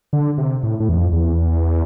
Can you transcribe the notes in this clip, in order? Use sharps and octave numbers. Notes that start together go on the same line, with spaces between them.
D3
C3
A2
A2
E2
F2
E2